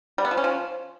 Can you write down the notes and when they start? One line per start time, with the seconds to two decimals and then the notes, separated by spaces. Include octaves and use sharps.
0.18 G3
0.25 B3
0.31 F3
0.37 C#4
0.44 F3